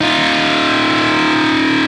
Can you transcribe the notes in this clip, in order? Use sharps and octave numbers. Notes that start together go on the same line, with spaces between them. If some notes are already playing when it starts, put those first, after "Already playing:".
D#4 F4